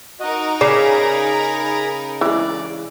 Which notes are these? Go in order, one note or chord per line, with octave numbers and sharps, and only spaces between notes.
D#4 F#4 A#4 D#5
C#3 G#4 D5 A#5 B5
E3 G#3 D5